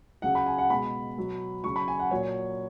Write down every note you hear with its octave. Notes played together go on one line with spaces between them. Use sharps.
C#3 F#3 F#5
B5
G#5
F#5
B2 G#3 B5
B2 F#3
C#3 F#3 C#6
B5
G#5
F#5
A#2 F#3 C#5